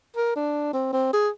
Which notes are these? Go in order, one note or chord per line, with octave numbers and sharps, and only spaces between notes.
A#4
D4
C4
C4
G#4